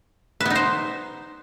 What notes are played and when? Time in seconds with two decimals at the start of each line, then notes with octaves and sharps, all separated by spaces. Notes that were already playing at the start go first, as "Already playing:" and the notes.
0.40 B4
0.45 B3
0.50 D#4
0.55 C5